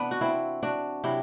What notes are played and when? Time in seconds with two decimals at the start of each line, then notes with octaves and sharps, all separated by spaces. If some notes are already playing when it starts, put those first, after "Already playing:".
Already playing: C3 E3 B3 D4
0.11 F#4
0.21 C4 E4
0.63 D4 F#4
1.04 C3 F#3 E4 G4